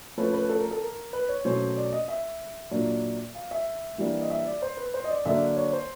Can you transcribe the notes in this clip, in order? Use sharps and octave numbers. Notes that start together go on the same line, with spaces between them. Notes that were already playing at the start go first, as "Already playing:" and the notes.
F3 A3 C#4 B4
B4
A4
A#4
A4
A#4
B4
C#5
B2 F#3 A3 C#4 C5
D5
D#5
E5
A#2 F#3 A#3 D4
F5
E5
E3 G3 A#3 D4
D#5
E5
D5
C5
B4
C5
D#5
D5
D3 F#3 A#3 D4 E5
C#5
C5